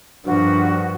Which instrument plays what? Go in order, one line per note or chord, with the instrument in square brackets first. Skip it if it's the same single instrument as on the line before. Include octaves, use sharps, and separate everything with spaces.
[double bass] G2 F3 [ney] D4 [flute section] F#4 A#4 B4